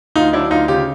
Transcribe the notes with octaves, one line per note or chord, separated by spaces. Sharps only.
D2 D#4 F4
F#3 D4 E4
D2 D#4 F4
C#3 F4 G4